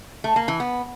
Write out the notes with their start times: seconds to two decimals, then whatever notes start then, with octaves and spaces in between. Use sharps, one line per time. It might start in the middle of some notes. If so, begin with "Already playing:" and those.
0.24 A3
0.36 A#3
0.48 E3
0.60 B3